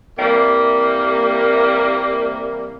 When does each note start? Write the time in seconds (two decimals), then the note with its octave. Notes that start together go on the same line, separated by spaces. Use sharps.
0.18 C3 E3 G3 A#3